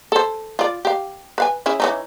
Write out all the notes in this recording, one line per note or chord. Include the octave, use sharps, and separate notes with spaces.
A4 C5
F4 D5
G4 F5
B4 F5 G#5
C#4 E4 G#4
E3 C#4 D#4